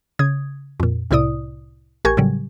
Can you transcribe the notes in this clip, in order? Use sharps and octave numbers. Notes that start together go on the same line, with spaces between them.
C#3 D#6 G#6
F2 A#2
C2 A2 C3 E4 D5 D#6
A1 G4 A#4 G#5 C#6 G#6
A2 C#3 F#3 G3